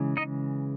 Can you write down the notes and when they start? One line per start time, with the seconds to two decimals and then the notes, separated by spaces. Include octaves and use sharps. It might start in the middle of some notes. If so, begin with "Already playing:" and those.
Already playing: C#3 E3 G#3
0.17 D#4 D#5